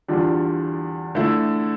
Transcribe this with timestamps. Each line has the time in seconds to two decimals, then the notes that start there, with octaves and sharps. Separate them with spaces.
0.08 E2 D3 G3 D4 F4
1.15 D3 A3 E4